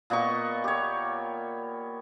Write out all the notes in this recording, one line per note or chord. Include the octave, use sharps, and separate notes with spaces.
A#2 B3 D#5 C#6
G4 C#5